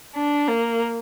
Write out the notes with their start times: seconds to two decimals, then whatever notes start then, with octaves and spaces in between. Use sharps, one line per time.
0.16 D4
0.48 A#3